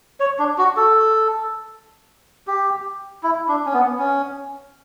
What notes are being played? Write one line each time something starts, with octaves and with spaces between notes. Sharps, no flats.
C#5
D4
F#4
A4
G4
E4
D4
C#4
B3
C#4